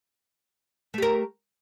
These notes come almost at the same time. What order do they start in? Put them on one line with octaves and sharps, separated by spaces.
A3 G4 A#4